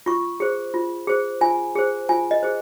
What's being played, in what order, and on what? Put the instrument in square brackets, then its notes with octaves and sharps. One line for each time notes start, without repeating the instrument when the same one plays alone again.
[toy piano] F4 C#6
G#4 C5
F4
G#4 C5
F4 G#5
G#4 C5
F4 G#5
D#5
G#4 C5